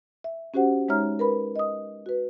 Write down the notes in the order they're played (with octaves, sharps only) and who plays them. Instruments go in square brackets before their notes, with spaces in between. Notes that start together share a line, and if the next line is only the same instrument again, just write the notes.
[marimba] E5
C#4 F#4 G4 C5 F#5
G#3 D#4 C#5 E5 A#5 F6
A#4 B4 B5
D#5 D#6
F#4 B4